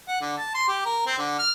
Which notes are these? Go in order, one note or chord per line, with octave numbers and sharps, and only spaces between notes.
F#5
D3
A5
C6
G4
A#4
C4
D3
F6